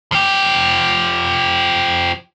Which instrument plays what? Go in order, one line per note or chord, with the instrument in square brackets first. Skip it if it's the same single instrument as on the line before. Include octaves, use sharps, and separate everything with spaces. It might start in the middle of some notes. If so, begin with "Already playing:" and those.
[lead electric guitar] F3 G4